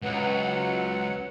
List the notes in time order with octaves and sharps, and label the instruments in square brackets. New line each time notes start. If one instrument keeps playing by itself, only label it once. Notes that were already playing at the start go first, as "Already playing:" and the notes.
[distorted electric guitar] C#2 [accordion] F#3 F#5 [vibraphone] B4